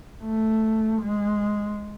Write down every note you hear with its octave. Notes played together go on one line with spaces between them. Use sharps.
A3
G#3